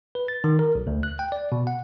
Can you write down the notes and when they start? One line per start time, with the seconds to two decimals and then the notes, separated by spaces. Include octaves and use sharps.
0.15 B4
0.28 A6
0.44 D#3
0.59 A#4
0.75 B1
0.87 D2
1.03 F#6
1.19 G5
1.32 D5
1.52 B2
1.67 F#5